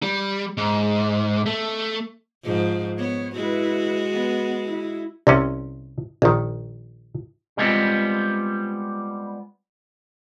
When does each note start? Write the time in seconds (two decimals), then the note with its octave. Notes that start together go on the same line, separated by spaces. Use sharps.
0.02 G3
0.58 G#2
1.46 A3
2.43 G#2 F3
2.98 B3 C#5
3.35 G#3 E4 F#4 B4
4.12 B3
4.65 E4
5.27 C2 C3 C#4
6.22 A#1 D#3
7.57 G3 G#3 B3 C4 F4